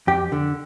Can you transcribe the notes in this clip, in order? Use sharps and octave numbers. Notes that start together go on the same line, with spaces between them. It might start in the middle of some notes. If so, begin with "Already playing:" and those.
F2 G4
D3